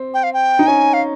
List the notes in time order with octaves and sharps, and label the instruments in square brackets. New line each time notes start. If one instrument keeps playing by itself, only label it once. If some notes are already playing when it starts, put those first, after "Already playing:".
Already playing: [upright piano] C4
[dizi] G5
F5
G5
[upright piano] D#4
[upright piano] C#4 [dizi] G#5
[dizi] F5